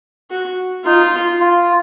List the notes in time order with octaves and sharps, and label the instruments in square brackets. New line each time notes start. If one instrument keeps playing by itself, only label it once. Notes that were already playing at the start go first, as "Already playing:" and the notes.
[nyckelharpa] F#4
[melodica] D#4 [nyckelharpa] F4
[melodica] F4